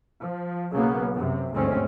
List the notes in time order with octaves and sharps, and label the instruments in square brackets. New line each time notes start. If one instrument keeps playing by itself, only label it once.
[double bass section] F3
B1 C#3 F#3 A#3 B3
F#2 C3
G1 D2 G#2 B2 C4 C#4